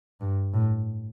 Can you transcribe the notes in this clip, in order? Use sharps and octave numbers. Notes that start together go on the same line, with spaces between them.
G2
A2